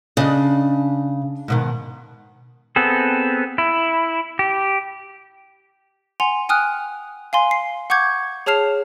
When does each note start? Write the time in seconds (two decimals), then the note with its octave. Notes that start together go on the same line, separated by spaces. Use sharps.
0.17 C#3 D4 D5 D#5
1.48 G#2 B2 D#3
2.76 B3 C4 G#4 A4
3.58 E4
4.39 G4
6.20 F#5 G#5 C6 F7
6.49 G5 G#5 D#6 F6 F#6
7.33 F5 G#5 C6
7.51 C7
7.90 F#5 C#6 D6 G6 G#6
8.46 G#4 C#5 A5 F6 C7 F7